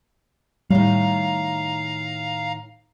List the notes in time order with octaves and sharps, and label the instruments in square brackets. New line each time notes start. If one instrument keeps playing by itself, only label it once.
[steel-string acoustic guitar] A2 D#3 [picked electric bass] G3 [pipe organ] F5 A#5